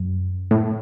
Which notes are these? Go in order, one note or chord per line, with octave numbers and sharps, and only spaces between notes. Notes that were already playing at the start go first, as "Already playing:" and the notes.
Already playing: F#2
A2